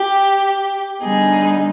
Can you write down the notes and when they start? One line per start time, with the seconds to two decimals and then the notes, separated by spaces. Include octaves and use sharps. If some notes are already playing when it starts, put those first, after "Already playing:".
Already playing: G4
1.03 D3 G3 B3 D#4 G#4